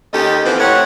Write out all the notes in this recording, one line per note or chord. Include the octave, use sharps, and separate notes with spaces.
D#2 C#4 G4 A4 D#5
E3 F3 B3 C4 B4 C5
A2 C3 C#5 F#5